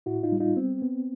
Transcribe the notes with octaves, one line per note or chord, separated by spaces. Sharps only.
A2 E4 F#4
D#4 F4
G3
D#4 F4
B3 C4
B3